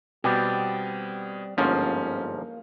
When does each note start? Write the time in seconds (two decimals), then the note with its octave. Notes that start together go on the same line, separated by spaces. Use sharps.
0.24 B2 G3 B3 C4 G4
1.58 G1 G#2 F3 A#3 C#4